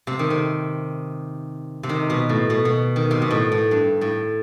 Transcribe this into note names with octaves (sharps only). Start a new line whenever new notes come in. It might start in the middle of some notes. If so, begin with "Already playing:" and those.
C3
D#3
C3
C3
D#3
B2
A2
B2
B2
D#3
C3
B2
A2
A2
G2
A2